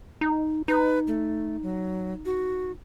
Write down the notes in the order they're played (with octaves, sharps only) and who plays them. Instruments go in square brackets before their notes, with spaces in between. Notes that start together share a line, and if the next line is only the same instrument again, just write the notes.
[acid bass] D#4
[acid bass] D#4 [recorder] B4
[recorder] A3
F#3
F#4